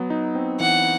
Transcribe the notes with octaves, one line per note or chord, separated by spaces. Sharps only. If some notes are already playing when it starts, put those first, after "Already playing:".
Already playing: F#3 B3
D#4
C4
E3 F#5